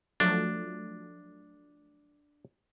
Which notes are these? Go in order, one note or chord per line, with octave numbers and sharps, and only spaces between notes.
F3 F#3 A3 D4